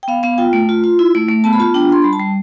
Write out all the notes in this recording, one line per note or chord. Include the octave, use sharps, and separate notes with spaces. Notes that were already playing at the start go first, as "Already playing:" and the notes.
G5
B3 F5
B3 F5
F4 G5
A3
F4
F4
E4
A3
A3
B3 A5
B5
F4 A5
D4 G5
D4 C6
G3 B5
A5
G3